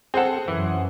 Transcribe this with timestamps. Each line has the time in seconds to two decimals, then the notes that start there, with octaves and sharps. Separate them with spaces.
0.14 C4 G#4 A4 C5 F#5
0.48 F#2 E3